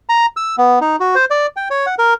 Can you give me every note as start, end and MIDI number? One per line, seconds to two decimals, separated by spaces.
0.09 0.26 82
0.37 0.56 88
0.58 0.79 59
0.81 0.96 63
1.00 1.15 66
1.15 1.25 72
1.30 1.46 74
1.56 1.68 79
1.70 1.86 73
1.86 1.95 78
1.99 2.14 70